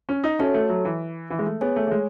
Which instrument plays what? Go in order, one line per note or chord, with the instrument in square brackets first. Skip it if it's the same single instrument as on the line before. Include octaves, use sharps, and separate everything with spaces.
[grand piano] C#4
D#4
[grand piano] C#4 [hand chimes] F#4 A4 C#5 E5 A5
[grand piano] A3
F#3
E3
E3
G#3
A3
[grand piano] B3 [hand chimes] G#4 C#5 G#5
[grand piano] A3
A3
G#3